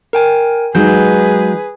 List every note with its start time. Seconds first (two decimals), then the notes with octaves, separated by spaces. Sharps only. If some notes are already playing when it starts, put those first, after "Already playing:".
0.13 A#4 G5 G#5
0.75 F#3 G#3 D#4 G#4 B4 G6